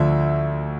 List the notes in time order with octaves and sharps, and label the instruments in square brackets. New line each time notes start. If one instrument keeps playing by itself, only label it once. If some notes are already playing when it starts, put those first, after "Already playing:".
Already playing: [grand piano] D2 D3 F3 E5